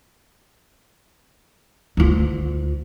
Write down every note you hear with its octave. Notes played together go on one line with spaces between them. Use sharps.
D2 F4